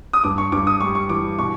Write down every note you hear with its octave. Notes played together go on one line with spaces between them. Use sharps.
D#6
G2 D6
C#6
G2 D6
D#6
G3 C#6
C#6
E3 D6
B2 C#6